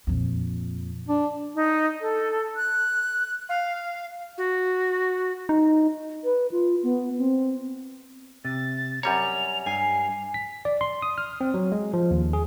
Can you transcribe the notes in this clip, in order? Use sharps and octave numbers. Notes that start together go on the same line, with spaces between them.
F2 A#2
D4
D#4
A4
F#6
F5
F#4
D#4
B4
F4
B3
C4
C3 A6
F#2 G3 C#5 A#5 F7
G2 G#5 C7
B6
D5
C6
D#6
F6
C4
F#3
G#3
F3
D#2
G#4